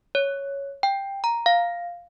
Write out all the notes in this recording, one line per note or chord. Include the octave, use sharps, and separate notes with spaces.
C#5
G5
A#5
F5